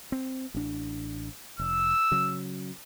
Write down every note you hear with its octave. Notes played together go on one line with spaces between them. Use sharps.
C4
A1 D4
F1 E6
C#3 F#3